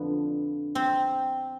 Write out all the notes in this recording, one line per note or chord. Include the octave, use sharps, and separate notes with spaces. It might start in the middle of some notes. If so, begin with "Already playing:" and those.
Already playing: F2 D3 F3 B3
C4